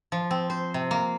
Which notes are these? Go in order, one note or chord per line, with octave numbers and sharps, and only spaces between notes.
F3
C4
C5
C3
A#3